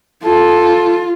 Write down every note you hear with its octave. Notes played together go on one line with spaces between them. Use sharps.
F4 A4